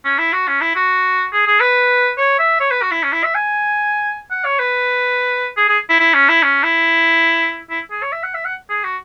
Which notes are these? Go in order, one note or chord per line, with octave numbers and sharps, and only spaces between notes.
C#4
E4
F#4
C#4
E4
F#4
G#4
G#4
B4
C#5
E5
C#5
B4
F#4
E4
C#4
E4
E5
G#5
F#5
C#5
B4
G#4
G#4
E4
E4
C#4
E4
C#4
E4
E4
G#4
C#5
E5
F#5
E5
F#5
G#4
F#4